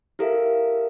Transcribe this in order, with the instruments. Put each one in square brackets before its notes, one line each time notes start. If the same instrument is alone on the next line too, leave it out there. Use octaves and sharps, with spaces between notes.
[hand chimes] E4 G4 A4 A#4 E5 F5